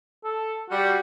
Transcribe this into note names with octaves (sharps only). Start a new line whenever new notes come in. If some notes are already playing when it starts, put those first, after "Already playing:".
A4
G3 F#4